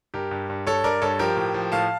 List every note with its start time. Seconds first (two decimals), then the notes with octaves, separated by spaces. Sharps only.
0.14 G2 G4 A#4
0.31 G2
0.49 G2
0.67 G2 A4 C#5
0.84 G2 A#4 D5
1.02 G2 A4 C#5
1.19 F3 G4 A#4
1.37 A2
1.54 F3
1.72 A2 F5 A5